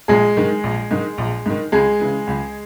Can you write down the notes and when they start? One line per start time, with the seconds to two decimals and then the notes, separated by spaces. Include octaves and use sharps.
0.08 A#1 G#3 G#4
0.37 G#2 D#3
0.63 A#1
0.91 G#2 D#3
1.18 A#1
1.46 G#2 D#3
1.72 C#2 G#3 G#4
1.99 C#3 E3
2.27 C#2